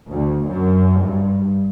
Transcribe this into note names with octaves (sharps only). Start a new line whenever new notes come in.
D2
F#2
G2